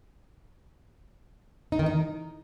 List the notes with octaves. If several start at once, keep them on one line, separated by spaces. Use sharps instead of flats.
D#4
D#3
D#4